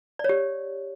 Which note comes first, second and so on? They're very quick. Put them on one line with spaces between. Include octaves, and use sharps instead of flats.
D5 C#5 G4